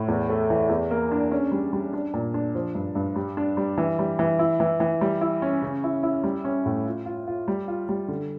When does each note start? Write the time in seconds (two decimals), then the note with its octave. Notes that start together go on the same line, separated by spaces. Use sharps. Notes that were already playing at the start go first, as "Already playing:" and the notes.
Already playing: A2
0.08 E2
0.30 A3
0.50 E3
0.69 E2
0.91 A#3
1.11 D4
1.31 C#4
1.52 G3
1.73 G3
1.93 D4
2.14 A#2
2.34 D4
2.55 F3
2.75 G2
2.95 G2
3.16 G3
3.37 D4
3.57 G3
3.78 E3
3.99 G3
4.19 E3
4.39 E4
4.60 E3
4.80 E3
5.01 G3
5.21 E4
5.42 C#4
5.62 C#3
5.84 E4
6.03 E4
6.24 G3
6.45 C#4
6.66 A2
6.85 F4
7.06 F4
7.27 F4
7.48 G3
7.68 F4
7.89 G3
8.08 D3